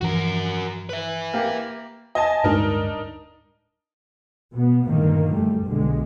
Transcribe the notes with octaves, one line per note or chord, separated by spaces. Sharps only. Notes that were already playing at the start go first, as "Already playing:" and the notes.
G2 E3 F3 F#4 A#4
B4 E5
A#3 G4
D#5 G#5 A5
D1 G2 G#3 D4 D#4 A#4
B2 B3
G2 A#2 D3 D#3 A#3
F#2 G3 A3
B1 D3 G#3